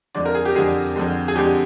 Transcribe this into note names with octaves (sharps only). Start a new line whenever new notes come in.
F2 D3 G#3 D5
A#4
G#4
G4
F2 D3 G#3 G#4
F2 D3 G#3
G#4
F2 D3 G#3 G4